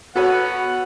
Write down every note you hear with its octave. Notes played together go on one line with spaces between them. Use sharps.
B3 F#4 A4 B4 C#5 F#5